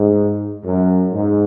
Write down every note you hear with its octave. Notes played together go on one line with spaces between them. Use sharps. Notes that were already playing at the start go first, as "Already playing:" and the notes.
Already playing: G#2
F#2
G#2